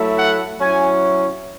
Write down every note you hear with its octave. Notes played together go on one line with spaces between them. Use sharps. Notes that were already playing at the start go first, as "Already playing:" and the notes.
Already playing: F#3 A3 E4
F#5
F#3 C#4 E4 G#5